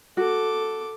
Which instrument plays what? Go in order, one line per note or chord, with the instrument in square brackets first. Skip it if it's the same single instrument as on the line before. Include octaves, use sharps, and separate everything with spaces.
[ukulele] F#4 [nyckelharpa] A4 D6